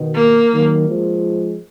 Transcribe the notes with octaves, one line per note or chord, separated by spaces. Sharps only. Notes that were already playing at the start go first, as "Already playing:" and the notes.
Already playing: B2 D#3
A#3
D#3 F#3
F3 G#3